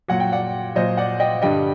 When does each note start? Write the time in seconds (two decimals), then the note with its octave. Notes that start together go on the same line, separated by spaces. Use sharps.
0.08 A#2 F#3 F#5
0.20 G5
0.32 D5 F#5
0.75 A#2 F#3 C5 D#5
0.97 D5 F#5
1.20 D#5 G5
1.42 G2 D3 G3 D#5 G5